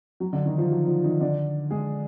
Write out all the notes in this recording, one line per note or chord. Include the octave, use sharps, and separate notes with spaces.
F#3 F#4
D3 D4
D#3 D#4
F3 F4
F#3 F#4
F3 F4
D#3 D#4
D3 D4
G#3 G#4